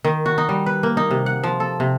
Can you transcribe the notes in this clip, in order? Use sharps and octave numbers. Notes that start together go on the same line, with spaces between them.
D#3
F#4
D#4
G3
B4
A#3
D#4
C3
F#5
F3
A4
C3